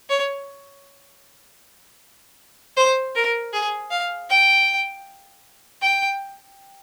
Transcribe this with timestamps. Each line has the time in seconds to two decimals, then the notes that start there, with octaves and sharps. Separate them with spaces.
0.09 C#5
2.77 C5
3.15 A#4
3.53 G#4
3.91 F5
4.30 G5
5.82 G5